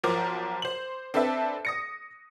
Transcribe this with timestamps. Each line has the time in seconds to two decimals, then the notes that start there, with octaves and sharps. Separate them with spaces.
0.03 B1 F3 A#4 C5 A#5 D6
0.62 C5 F#7
1.14 C4 D4 A4 B4 E5
1.65 D#6 A#6 C#7